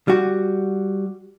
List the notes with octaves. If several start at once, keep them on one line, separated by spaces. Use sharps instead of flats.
G3 F#4